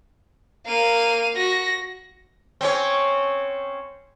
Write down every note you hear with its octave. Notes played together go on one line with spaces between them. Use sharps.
A#3 F5 D#7
F#4 A#6
C4 C#4 C#5